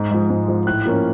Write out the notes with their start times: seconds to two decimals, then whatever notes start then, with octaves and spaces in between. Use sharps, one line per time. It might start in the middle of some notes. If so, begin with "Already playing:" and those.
Already playing: G#2
0.11 F3 G#3
0.30 G#2
0.48 F3 G#3
0.67 A2 F#6
0.86 F3 A#3 C#4